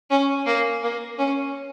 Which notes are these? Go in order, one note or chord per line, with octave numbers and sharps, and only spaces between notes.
C#4
A#3
A#3
C#4